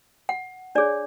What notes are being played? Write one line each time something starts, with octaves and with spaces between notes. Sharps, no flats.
F#5
D4 G#4 C#5 D5